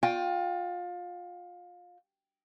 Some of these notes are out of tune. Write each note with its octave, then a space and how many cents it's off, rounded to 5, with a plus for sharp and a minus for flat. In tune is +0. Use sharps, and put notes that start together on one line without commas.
F4 +25 G5 +0